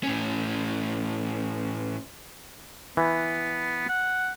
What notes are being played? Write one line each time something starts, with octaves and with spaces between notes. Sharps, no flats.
A2 C#4
E3 B3
F#5